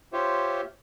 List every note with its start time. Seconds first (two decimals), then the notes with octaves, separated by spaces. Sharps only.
0.13 F4 G4 C5 C#5 E5